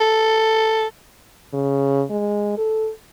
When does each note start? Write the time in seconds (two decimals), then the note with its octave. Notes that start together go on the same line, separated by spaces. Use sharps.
0.01 A4
1.53 C#3
2.10 G#3
2.58 A4